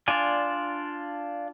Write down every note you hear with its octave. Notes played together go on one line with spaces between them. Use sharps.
D4 F4 D5 G#5